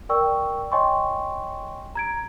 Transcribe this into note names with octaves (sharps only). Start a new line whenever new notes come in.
A#4 D5 G5 C#6 E6
C#5 D#5 G5 G#5 C6 C#6
A#5 G#6 D7